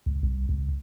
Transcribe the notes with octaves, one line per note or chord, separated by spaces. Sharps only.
C#2
C2
C#2